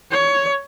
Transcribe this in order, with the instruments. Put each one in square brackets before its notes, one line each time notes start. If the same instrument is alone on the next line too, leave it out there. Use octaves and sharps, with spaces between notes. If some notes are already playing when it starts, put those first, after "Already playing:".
[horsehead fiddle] C#5